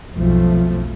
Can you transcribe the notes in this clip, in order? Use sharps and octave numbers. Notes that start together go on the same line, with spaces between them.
B1 F2 F3 A3